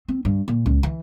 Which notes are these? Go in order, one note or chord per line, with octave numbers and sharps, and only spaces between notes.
C4
G2
A#2
C#2
E3